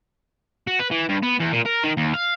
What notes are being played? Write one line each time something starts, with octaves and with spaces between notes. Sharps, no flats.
F#4
B4
E3
G2
B3
E2
A#2
A#4
D#3
D#2
F5